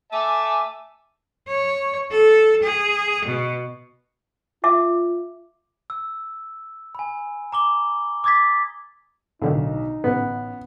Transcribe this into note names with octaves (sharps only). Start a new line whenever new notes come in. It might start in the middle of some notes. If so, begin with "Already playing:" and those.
E5 G#5 A5 D6
C#5
A4
G#4
B2
F4 E5 D6
E6
G#5 B5
A#5 D6 G7
D6 D#6 G#6 A6 B6
B1 A2 D3 D#3 D#4
A1 B3